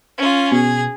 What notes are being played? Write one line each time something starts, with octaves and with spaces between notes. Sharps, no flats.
C#4 F4
B2 G#4